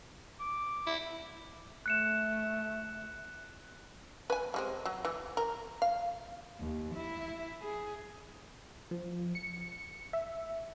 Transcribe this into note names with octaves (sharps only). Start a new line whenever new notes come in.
D6
E4
A3 F#6 C#7 E7
B4 G#5
G3 G#3 C4
F#3
E3
A#4
F5
D#2
E4 E5
G#4
F3
C#7
E5